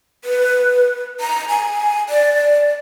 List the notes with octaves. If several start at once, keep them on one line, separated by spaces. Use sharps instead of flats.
B4
A#5
G#5
D5